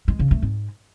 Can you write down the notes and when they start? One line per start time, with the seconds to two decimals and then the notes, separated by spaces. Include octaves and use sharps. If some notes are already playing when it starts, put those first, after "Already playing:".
0.08 G#3
0.19 C#3
0.31 A3
0.43 G#2